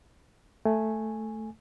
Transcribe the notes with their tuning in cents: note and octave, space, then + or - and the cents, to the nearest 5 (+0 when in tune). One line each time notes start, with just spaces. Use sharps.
A3 +0 G#5 +0